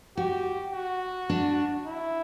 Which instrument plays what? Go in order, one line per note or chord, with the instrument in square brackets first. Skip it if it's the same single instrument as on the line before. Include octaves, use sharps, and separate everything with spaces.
[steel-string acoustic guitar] F#4 [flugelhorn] G4
[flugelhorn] F#4
[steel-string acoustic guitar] D4
[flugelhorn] E4